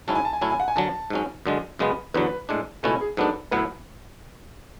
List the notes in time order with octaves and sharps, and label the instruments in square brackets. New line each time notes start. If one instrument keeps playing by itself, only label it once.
[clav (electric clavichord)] G#2 F#3 C#4 E4 [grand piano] A5
[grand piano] G#5
A5
G#5
[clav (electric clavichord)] A2 F#3 C#4 E4 [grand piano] A5
[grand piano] G#5
F#5
G#5
[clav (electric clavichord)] F#2 D3 F#3 [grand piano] A5
[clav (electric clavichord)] G#2 F#3 C#4
F#2 D3 G#3
F#2 C#3 G#3 B3
[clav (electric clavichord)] E2 D3 F#3 [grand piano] B4
[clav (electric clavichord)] A2 G#3 D4
[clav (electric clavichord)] C#2 B2 A3 C#4 E4 [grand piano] A4
[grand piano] G#4
[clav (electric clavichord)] G#2 F#3 B3 D4 [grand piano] A4
[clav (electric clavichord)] A2 F#3 B3 E4 [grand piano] B4